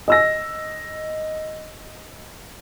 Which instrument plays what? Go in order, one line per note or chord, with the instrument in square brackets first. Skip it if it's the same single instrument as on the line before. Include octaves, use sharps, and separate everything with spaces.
[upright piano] D#5 E6 A#6